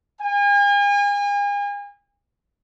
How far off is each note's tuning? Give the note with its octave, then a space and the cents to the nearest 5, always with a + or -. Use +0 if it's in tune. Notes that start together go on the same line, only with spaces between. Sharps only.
G#5 -40